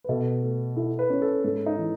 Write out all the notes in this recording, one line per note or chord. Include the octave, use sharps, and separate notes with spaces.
B4
B2 A4
A3
E4 A4
B4
C#4
A4
G#2 A4
D#4
E3